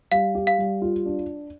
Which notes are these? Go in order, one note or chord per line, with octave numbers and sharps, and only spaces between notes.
G3 F5
G4
F5
G3
F4
D4